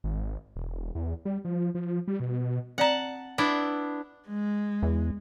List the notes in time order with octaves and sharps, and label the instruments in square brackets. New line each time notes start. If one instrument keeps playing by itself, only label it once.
[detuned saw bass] G#1
E1
E2
G3
F3
F3
G3
B2
[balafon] C4 D5 A#5 [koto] F#5 A5
[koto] B3 D4 E4
[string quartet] G#3
[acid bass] E2